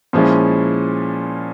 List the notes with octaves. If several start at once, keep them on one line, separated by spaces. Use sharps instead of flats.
A#2 F3 G#3 C#4 E4